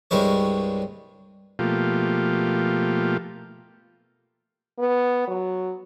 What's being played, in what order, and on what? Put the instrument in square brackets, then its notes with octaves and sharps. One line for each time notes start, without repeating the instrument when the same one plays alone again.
[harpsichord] C2 G2 G3 G#3 C#5
[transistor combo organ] B2 F3 A3 A#3 F4 G4
[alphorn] B3
F#3